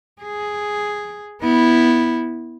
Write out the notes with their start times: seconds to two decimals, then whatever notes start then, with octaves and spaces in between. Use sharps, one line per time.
0.22 G#4
1.42 B3 E4